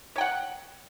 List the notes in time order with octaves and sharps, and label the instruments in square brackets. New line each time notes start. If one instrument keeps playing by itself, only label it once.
[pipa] C#5
G5
F#5